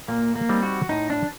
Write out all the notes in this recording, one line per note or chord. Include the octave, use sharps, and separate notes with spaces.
A#2 A#3
A#3
G3 C4 D#4
F#4
A2 D#4
D4